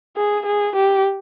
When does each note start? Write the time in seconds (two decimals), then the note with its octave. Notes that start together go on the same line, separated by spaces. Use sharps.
0.17 G#4
0.46 G#4
0.76 G4